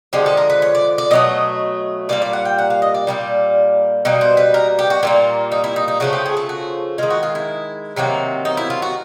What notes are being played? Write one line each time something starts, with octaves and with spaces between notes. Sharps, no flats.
D3 F3 G#3 G4
A4
A#4
B4
C#5
D5
D5
B2 F#3 A3 D#5
A#2 G3 A#3 D5
D5
F#5
G5
F#5
F5
D#5
D5
A#2 G3 A#3
B2 G3 A#3
C5
B4
A#4
G4
F#4
A#2 G3 A#3 F4
D#4
E4
D#4
D#4
C#3 F3 A3 F#4
G4
G#4
A4
F#4
D#3 G#3 F4
F#4
F4
E4
C3 D#3 F#3 A#3
D#4
E4
F4
F#4